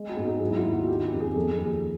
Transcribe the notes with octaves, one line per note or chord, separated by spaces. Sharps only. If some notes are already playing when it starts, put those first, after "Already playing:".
Already playing: G#3
F#4
G#2
G#4
F#3 F#4
E4
F4
D#2
F#4
D#3 G4
G4
F2
G#4
F3 A4
G#4
D#2